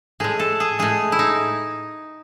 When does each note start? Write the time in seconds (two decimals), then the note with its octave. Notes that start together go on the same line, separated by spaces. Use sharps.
0.20 A2 G#3 G#4
0.40 A4
0.60 G#4
0.79 A2 G#3 G#4
1.12 E4
1.19 D#4